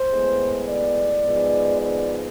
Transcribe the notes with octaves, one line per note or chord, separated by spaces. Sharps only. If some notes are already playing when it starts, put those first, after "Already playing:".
Already playing: C5
A2 G#3 B3
D5
G#2 F3 G#3 B3
D5